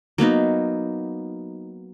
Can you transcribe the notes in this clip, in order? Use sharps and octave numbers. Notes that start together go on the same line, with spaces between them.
F#3 A#3 B3 D#4